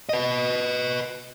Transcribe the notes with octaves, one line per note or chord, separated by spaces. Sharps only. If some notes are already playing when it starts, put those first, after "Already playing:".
B4 D#5